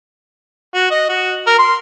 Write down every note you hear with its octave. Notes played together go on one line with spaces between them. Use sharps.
F#4
D#5
F#4
A#4
C6